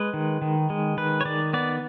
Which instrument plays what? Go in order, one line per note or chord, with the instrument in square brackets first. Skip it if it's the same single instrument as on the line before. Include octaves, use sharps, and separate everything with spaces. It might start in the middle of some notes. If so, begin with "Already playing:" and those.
Already playing: [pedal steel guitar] G#3 B4
D#3
D#3
G#3
D#3 B4
C#5
D#3 D5
B3 D5